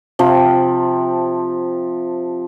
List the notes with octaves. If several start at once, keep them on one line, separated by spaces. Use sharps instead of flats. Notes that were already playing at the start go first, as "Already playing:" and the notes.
C3 F3